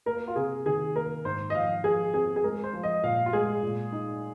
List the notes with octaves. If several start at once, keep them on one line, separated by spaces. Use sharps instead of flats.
A#3 A#4
F4
C3 G#4
D#3 G#4
A#3 A#4
G#2 C5
D#5
F3 F5
F3 G#4
C4 G#4
G#4
G#3 A#4
C5
F3
D#5
A#2 F5
F4
G#3 G#4
A#2
D#4